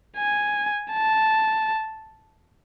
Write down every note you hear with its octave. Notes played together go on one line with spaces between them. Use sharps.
G#5
A5